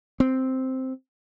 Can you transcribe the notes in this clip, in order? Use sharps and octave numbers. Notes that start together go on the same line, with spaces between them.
C4